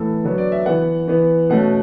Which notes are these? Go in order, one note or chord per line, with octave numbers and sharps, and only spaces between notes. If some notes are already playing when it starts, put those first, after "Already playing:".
Already playing: A2 E3 B3 A4
D3 F#3 B3
D5
E5
E3 B3 F#5
E3 B3
B2 A3 C#4 F#5